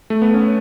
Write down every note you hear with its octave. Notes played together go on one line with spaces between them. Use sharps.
A3
B3
C#4